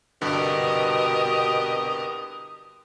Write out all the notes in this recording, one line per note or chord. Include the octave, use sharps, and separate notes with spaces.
C2 G2 B2 D3 G4 A#4 D#6